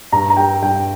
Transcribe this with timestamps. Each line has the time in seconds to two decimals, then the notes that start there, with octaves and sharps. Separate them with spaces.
0.12 G2 A#5
0.30 A#5
0.37 G3 G5
0.62 G2 G5